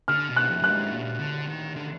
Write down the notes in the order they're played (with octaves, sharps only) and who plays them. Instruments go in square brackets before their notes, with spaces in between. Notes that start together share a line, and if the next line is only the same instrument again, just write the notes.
[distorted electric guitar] D3 [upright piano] F6
[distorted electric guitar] B2
[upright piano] F#6
[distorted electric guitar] F2
[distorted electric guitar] F#2 [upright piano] F#6
[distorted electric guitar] G#2
A#2
D3
D#3
D3